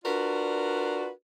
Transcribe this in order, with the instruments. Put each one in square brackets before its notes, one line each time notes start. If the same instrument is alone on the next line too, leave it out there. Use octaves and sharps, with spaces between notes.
[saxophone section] D4 F4 F#4 A#4 B4 D5